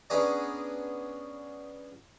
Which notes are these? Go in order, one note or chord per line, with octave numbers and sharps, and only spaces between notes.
B3 C#4 D4 G#4 D5 A#5